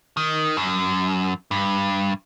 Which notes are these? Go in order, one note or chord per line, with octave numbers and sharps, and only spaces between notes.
D#3
F#2
G2